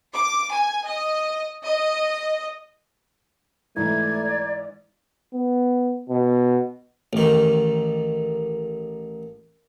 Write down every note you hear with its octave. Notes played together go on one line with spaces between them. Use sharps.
D6
G#5
D#5
D#5
G#2 E3 A3 D5 G#6
B3
B2
A1 D#3